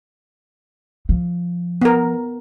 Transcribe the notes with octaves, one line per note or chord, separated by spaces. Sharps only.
F3
B3 A#4